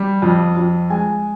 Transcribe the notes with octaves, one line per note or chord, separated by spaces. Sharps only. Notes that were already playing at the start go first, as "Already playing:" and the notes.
Already playing: G3
F2
F2
G#3 G#5